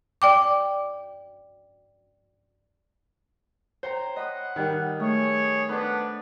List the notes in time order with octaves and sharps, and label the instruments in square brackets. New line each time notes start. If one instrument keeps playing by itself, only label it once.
[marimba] D5 G5 D6
[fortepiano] C5 [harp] C#5 G5 A#5
[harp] D#5 B5 D#6 [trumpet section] F#5
[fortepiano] D#3 G3 [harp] F#6
[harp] A3 [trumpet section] G#4 C#5
[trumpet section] B3 D4 [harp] A4 B4 C5